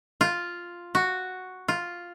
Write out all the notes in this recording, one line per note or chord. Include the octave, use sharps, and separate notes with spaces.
F4
F#4
F4